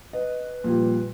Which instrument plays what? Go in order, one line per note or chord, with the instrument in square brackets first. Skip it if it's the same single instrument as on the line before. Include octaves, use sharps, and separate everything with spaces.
[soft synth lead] B4 [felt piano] D#5
[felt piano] A#2 F3 G3